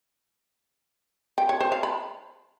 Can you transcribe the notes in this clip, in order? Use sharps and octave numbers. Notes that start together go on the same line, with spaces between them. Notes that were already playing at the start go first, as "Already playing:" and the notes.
G5
C#5
C5
F5
B5